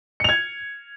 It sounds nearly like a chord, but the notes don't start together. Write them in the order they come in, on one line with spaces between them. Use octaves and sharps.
C#7 F7 G#6